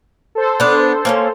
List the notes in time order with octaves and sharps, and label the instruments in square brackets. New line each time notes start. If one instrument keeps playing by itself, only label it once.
[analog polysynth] A4 C5
[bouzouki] B3 D4
A#3 C4 C#4